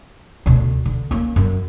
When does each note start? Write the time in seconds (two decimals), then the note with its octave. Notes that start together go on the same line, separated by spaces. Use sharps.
0.46 D2 B2
0.86 D3
1.11 A#3 C#4
1.36 F#2